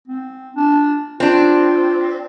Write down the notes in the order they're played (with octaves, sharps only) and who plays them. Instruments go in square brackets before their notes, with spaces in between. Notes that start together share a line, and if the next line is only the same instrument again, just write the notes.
[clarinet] C4
D4
[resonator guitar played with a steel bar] C4 D4 [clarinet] F4